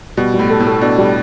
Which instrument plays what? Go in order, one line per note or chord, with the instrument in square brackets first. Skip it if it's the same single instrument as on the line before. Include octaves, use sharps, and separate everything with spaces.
[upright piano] B2 [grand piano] G3
[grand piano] G3
[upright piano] A2
[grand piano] A4
[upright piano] A2
[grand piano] A4
[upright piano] B2 [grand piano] D4
[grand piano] G3